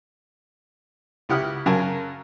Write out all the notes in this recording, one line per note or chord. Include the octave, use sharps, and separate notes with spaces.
C#2 E4 G4 F#5 D#6 F6
F#2 C#3 F#3 A#4 G#5 A5